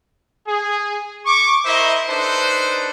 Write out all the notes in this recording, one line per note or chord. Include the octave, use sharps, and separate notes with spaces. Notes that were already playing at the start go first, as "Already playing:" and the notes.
G#4
C#6 D6
E4 A#4 C5 D#5 E5
D4 D#4 A4 B4 C5